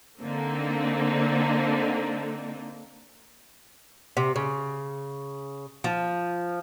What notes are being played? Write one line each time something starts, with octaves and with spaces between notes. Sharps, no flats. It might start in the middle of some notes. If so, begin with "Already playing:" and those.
D3 A#3 C4 D#4
C3
C#3
F3